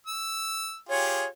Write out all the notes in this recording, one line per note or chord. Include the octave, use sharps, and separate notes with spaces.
E6
F4 G4 G#4 C#5